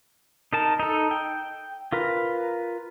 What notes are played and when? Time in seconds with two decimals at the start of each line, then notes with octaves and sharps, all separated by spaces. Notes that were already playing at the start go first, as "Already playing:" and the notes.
0.53 D#4 A#4 A5
0.80 D#4 A4
1.11 G5
1.92 F4 A#4 B4